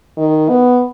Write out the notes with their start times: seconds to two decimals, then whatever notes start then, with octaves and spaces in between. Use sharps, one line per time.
0.17 D#3
0.49 B3